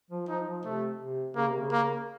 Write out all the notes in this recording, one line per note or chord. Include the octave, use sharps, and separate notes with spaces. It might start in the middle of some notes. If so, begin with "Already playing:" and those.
F3
F3 D#4
F3
C3 A3
C3
C#3 A#3
C3
C#3
A#3